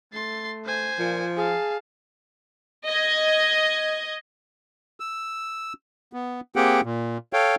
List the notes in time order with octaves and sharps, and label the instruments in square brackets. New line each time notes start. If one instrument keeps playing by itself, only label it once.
[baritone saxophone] A3 [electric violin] C6 A6
[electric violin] C5 G#5
[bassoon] A#2 [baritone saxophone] F3
[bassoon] G#4 [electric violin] F5 A5
[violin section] D#5 G#6
[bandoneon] E6
B3
A#3 C4 G4 G#4 F#5 G5
A#2
A4 C#5 F5 G5